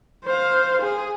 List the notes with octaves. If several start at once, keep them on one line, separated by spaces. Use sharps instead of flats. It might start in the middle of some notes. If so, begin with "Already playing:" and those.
C5 F5
G#4